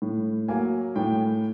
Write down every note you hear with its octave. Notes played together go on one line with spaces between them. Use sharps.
A2
F#3 A#3 G#5
A2 G5